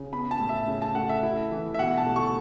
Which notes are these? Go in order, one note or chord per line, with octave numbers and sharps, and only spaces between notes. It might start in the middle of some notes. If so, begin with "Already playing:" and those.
Already playing: C#3
B3 B5
A5
A2
E5
C#3
A5
A3 F#5
E5
E4
E3
E5
B2 F#5
A5
A3
C#6